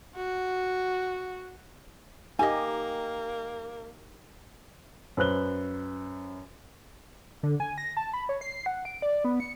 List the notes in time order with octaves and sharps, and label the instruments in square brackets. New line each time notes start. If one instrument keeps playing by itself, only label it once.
[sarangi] F#4
[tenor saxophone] A#3 [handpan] D#4 G4 [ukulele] D#5 G#5
[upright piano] F#2 B4 C5 F#6 G7
[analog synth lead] D3
G#5
A#6
A5
B5
C#5
C7
F#5
D7
D5
B3
C#7